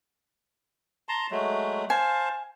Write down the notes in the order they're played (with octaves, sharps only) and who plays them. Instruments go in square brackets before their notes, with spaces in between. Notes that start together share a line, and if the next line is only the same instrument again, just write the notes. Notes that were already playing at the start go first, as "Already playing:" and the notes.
[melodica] A5 A#5 C6
F#3 G#3 A3
[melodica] C5 F5 A5 [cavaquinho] G#5